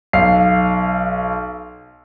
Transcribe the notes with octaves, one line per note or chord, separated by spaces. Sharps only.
B1 F5 C7